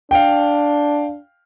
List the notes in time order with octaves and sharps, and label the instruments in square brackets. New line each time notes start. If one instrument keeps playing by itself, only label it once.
[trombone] D4 [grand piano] F5 G5